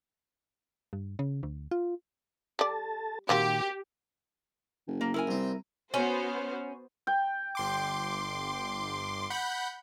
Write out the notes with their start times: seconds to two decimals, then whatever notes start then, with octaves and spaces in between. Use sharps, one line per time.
0.93 G2
1.19 C#3
1.43 D2
1.71 F4
2.59 G3 A4 D5 A5
3.29 A#2 D#3 F#3 A#3 C4 G4
4.88 F#1
5.01 A#3
5.14 E4 A#4 G#5
5.27 C2 C4
5.94 B3 C#4 F#4 C5
7.07 G5
7.55 G1 C6 D6
9.30 F#5 B5 G6